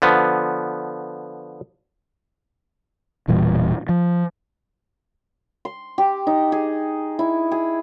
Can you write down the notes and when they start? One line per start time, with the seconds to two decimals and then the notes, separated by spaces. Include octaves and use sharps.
0.02 D3 F3 B3
3.28 E1 A#2 E3 G3
3.89 F3
5.65 C6
5.98 G4
6.27 D#4
6.52 G#4
7.19 E4
7.52 G#4